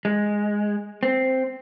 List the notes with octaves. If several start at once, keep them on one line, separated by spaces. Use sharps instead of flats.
G#3
C4